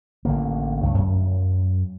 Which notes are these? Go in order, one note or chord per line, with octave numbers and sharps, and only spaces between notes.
A1 D3 A#3
C#2 G2 A3
F#2